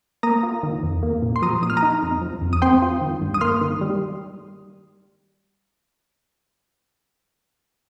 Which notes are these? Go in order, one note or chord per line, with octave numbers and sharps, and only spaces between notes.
A#3 A#5 D#6
F4
D#3
F2
A#3
A#2
C6
F3 A#5 D#6
A#2 D#6
F6
A#5 D#6
D#4
F2
F3
F2
D#6
C4 G5 C6
F4
D#3
G2
D#6
A#3 C6 F6
D#3
G3